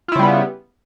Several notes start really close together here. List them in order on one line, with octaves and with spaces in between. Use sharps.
F4 E4 C#3 G3 B3